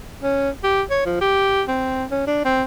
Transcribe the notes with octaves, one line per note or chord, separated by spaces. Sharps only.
C#4
G4
C#5
F3
G4
C4
C#4
D4
C4